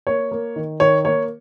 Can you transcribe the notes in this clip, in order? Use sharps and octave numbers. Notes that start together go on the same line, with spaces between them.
A#3 C#5
A#3
D#3
D#3 C#5
A#3 C#5